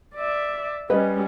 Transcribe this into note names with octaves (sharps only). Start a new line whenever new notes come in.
D5 E5
G3 C#4 B4 D#5